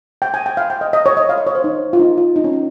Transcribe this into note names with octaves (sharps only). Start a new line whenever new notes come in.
G5
G#5
G5
F5
G5
D#5
D#5
C#5
D#5
F5
D#5
C#5
C5
D#4
F4
D#4
F4
D#4
C#4
D#4